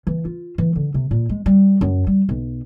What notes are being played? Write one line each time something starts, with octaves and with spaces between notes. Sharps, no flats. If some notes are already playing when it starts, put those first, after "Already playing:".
E3
F4
E3
D3
C3
A#2
G#3
G3
F#2
G3
B1